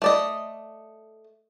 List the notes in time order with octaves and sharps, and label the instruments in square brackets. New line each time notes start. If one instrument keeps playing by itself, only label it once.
[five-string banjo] A3 D5 D#5